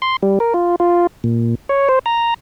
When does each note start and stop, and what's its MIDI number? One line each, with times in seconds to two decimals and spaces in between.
0.02 0.16 84
0.23 0.39 55
0.40 0.53 70
0.54 0.76 65
0.80 1.07 65
1.24 1.55 46
1.69 1.88 73
1.89 1.99 72
2.06 2.34 82